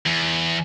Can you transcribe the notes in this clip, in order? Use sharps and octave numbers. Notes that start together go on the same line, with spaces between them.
E2